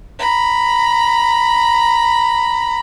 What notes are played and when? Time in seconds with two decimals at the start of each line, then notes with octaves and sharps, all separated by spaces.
0.19 A#5 B5